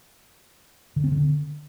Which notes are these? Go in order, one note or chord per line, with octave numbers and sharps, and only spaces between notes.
D3
C4
D3